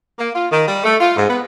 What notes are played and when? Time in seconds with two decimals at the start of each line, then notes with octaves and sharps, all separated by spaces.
0.19 A#3
0.35 F4
0.51 D#3
0.68 G3
0.84 A3
1.00 F4
1.17 G#2
1.29 B3